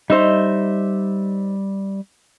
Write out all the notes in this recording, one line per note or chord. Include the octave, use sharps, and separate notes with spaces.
G3 D#4 C5 E5